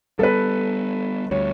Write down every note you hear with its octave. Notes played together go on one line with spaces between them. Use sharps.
G3 B3 A4 B4
D2 G3 C#5